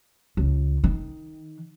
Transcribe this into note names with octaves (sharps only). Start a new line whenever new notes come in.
C#2
D#3